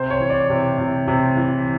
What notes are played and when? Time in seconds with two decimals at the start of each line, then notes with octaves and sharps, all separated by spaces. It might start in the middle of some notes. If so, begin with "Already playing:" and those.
Already playing: C3 C5
0.11 C#5
0.20 E3
0.30 D5
0.50 C3
0.79 C3
1.08 C3
1.37 E3